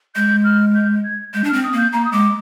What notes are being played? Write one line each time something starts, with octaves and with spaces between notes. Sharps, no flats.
G#3 G6
F6
G6
G#6
G#3 G6
D4
C4 F6
D#6
A#3 G6
A#3 A#5
D#6
G#3 D6